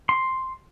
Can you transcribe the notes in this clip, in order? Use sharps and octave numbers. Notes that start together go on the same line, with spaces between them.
C6